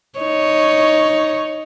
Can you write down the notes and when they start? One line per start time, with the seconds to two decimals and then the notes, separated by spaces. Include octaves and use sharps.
0.19 D#4 C#5